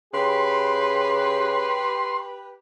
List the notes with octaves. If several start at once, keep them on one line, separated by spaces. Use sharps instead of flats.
C#3 G4 B4 C6